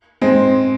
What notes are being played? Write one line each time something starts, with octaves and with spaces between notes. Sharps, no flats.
G#3 C4